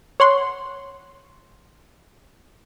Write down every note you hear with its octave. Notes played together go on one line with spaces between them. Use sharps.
C#5 F#5 C6